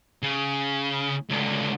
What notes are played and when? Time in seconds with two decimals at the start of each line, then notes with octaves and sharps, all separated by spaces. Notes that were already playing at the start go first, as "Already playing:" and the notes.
0.23 C#3
1.29 C#2 D3